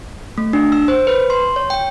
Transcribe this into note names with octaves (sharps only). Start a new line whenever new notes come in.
A3
D4
E6
C5
B4
C6
C#5
G5